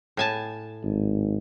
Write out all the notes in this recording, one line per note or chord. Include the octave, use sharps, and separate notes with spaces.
A2 G#5 A5
G#1